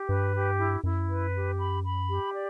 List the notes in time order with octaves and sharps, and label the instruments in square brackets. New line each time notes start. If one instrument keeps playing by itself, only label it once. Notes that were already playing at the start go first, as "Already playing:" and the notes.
Already playing: [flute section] G4
[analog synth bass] G2 [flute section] B4
[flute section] G4
E4
[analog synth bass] F#2 [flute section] E4
[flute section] B4
G4
B5
B5
G4
D5